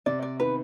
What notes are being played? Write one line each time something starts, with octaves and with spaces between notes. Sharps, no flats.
C3 D5
D5
D#3 B3 B4